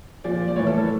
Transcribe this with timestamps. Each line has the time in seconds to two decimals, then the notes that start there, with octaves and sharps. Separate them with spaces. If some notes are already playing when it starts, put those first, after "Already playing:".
0.24 A#2 F3 D5
0.48 D5
0.56 A2 E3 C#5
0.67 A4
0.78 A4